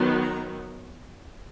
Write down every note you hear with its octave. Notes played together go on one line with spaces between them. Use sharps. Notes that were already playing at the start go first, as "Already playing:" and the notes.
Already playing: D#3 F#3 B3
A#5